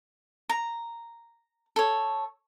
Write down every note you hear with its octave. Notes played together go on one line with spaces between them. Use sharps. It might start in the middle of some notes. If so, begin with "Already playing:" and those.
A#5
A4 C#5